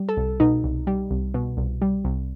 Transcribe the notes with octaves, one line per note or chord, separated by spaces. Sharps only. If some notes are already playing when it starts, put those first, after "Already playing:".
Already playing: G3
A4
C2
B2 D#4
C2
G3
C2
B2
C2
G3
C2